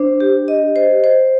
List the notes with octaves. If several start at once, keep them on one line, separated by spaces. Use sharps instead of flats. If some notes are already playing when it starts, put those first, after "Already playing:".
Already playing: D4 C5
G4
D#5
C5
C5